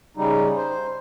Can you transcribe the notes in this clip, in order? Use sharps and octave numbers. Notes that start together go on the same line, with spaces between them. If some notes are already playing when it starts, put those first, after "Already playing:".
C#3 G3 D#4
C5